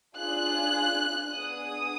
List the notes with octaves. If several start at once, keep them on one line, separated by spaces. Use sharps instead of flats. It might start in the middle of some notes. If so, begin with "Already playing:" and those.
D4 F4 G#4 F#6
B3 D4 G#4 D#6